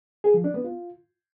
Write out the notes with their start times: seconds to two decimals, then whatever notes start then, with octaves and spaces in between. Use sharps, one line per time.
0.24 G#4
0.34 F3
0.44 D4
0.54 B3
0.64 F4